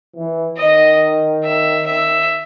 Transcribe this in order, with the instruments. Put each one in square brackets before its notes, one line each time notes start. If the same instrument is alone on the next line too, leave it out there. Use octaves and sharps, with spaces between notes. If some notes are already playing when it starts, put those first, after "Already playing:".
[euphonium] E3
[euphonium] D#3 [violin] D#5
[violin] E5
E5